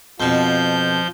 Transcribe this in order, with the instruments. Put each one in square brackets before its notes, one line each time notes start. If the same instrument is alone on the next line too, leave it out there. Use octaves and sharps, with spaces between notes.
[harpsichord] F2 B2 [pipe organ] F3 G6